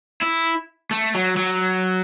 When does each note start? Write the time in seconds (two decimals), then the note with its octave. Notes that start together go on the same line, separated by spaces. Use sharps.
0.21 E4
0.91 A3
1.15 F#3
1.37 F#3